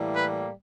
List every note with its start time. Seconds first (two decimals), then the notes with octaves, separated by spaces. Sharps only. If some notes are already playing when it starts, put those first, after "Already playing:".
Already playing: A2 E3 G3 A#3
0.15 B4